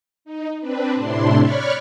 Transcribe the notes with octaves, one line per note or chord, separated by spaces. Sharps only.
D#4
C4 D4 B4
A2 C3 D4 E4 C6
C#5 D5 B5 C#6 F6 F#6